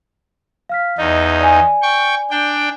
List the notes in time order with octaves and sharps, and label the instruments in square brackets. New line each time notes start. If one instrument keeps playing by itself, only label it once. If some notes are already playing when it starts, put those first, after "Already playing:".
[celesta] F5 F6 B6
[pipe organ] E2 D#4 [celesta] D#5
[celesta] D5 G#5
[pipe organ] G5 C#6
D4 G5